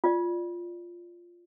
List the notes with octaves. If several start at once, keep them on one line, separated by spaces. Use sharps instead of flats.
F4 D5